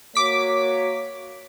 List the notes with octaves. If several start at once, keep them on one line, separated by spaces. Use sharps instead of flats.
A#3 F#4 C#5 D6 B6